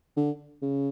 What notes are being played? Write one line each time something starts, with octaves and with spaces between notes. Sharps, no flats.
D3
C#3